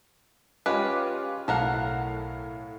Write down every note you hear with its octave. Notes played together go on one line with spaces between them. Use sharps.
G#3 C#4 F4 G4 B4 D6
B1 A2 A4 A#4 F5 F#5